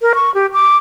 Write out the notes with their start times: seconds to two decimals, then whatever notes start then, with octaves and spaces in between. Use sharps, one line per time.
0.02 A#4
0.15 C#6
0.34 G4
0.53 D6